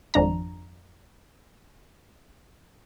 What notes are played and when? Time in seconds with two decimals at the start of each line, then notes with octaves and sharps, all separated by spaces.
0.14 G#1 F2 D4 A#5